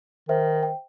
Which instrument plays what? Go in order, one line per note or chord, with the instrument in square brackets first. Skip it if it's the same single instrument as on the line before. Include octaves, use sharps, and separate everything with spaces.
[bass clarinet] D#3 [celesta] C5 E5
[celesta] G5